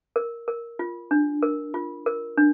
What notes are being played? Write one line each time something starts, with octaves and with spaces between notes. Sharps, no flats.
A#4
A#4
F4
D4
A#4
F4
A#4
D4